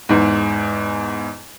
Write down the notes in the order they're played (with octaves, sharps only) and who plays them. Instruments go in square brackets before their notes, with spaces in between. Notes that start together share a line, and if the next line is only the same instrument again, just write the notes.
[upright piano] E2 G#2